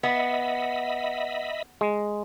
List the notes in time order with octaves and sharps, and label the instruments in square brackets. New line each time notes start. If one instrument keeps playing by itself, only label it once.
[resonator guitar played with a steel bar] B3 [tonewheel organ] D#5 E5 B5
[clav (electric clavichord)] G#3